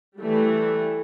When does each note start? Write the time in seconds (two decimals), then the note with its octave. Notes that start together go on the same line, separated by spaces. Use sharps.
0.20 E3 G3 A3